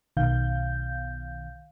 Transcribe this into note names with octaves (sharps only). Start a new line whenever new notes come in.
B1 B2 D#3 F5 G6